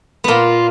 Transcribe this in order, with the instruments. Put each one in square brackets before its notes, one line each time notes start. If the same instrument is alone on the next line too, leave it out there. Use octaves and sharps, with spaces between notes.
[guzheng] A#2 A#3 B3 [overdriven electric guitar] F4